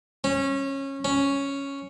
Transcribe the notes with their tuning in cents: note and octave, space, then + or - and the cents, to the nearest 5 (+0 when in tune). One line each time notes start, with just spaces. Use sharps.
C#4 -20
C#4 +0